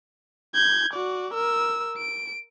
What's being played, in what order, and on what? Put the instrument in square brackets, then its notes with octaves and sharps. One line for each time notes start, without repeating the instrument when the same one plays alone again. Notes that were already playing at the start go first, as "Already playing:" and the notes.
[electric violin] G6 G#6
F#4 D5
A#4 E6
D7